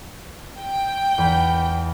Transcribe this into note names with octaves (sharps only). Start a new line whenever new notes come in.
G5
E2 B5